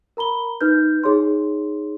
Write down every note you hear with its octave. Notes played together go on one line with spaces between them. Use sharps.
A#4 A#5 B5 G7
D#4 B4 F6 G6
D#4 G#4 C#5 C6